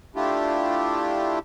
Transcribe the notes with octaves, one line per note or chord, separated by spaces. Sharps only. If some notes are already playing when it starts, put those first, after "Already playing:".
A3 D4 E4 F4 G4